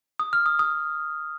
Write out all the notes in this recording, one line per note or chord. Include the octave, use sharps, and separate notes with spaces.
D#6
F6
D#6
D#6